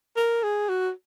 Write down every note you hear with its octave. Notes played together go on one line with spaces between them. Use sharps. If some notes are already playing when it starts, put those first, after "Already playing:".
A#4
G#4
F#4